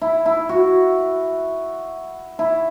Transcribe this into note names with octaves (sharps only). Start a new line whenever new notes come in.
E4
E4
F#4
E4